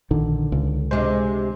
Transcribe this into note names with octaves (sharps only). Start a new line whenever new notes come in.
A#1 D3 D#3
C#2
D2 C3 G#3 C5